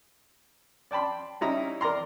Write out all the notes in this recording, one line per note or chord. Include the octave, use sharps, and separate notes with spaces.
D5 G5 A5 B5 C6
G3 C#4 D#4 E4 A#5
A#4 D5 A#5 C6